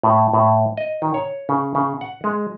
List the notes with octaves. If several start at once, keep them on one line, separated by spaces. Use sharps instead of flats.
A2
A2
D#5
D#3
C#5
C#3
C#3
F#5
G#3